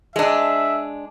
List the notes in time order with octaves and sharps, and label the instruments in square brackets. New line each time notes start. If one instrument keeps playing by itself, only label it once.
[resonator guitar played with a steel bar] G#3 D4 [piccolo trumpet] E5